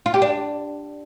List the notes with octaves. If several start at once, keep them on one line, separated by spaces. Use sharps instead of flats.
F4
G4
D4